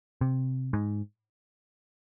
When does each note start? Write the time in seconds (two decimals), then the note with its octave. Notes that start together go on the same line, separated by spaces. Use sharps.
0.21 C3
0.73 G#2